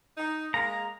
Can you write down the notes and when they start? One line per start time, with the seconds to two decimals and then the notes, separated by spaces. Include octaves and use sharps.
0.17 D#4
0.54 G#3 A#3 A#5